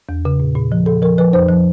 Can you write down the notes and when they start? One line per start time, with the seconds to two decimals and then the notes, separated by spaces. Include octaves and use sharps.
0.09 E2
0.25 C#3
0.40 A#2
0.55 A#2
0.72 F3
0.86 A#2 A4
1.02 F3 A#4
1.18 F3 B4
1.33 F2 C5
1.48 F3